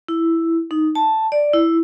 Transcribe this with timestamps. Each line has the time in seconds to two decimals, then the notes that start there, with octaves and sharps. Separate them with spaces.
0.08 E4
0.71 D#4
0.95 A5
1.32 D5
1.53 E4